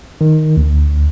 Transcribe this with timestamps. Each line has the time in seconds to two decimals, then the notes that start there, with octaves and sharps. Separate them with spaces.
0.21 D#3
0.57 D2